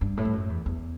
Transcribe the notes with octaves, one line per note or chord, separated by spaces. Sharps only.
G2
A2
G2
F#2
E2
E2